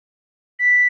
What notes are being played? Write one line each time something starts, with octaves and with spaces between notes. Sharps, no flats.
B6